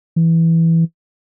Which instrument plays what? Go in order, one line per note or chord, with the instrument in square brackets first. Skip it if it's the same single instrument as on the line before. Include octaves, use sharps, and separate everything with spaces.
[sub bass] E3